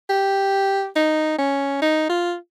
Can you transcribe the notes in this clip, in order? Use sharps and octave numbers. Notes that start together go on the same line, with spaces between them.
G4
D#4
C#4
D#4
F4